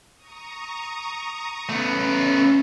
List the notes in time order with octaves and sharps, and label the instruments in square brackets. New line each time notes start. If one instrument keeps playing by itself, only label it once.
[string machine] A#5 C#6 D#6
[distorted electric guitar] A3 B3 [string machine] C#4